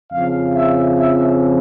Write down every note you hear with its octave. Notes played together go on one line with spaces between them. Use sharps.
F2 C#3 F3 F5
E5
E5